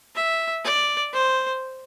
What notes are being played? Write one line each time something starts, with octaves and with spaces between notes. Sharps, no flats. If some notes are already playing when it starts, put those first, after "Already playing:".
E5
D5
C5